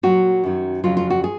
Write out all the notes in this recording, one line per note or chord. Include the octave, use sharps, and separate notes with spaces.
A#2 F#3 F#4
F#2 D#3 F#3
F2 C#3 F#3 F4
F4
F#4
G#4